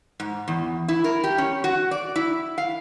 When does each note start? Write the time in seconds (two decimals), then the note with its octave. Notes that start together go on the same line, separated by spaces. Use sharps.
0.20 G#2
0.48 E2
0.88 E4
1.04 A#4
1.24 G4
1.38 C#4
1.64 F#4
1.91 D5
2.16 E4
2.58 F5